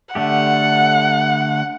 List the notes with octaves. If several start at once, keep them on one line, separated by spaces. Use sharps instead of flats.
D3 A3 G4 F#5